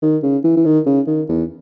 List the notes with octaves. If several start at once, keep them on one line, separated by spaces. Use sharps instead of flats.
D#3
C#3
E3
E3
D#3
C#3
D#3
E2